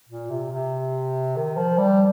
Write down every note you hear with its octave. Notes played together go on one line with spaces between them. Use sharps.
A#2
C3
C3
D#3
F3
G3